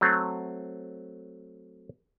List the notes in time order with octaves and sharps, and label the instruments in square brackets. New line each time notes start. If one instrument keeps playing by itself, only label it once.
[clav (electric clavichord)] F#3 A3 C4